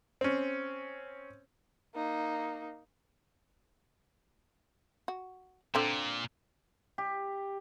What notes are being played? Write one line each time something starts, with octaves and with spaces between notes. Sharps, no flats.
C4 C#4
A#3 D#4
F#4
A#2 D3 C4
G4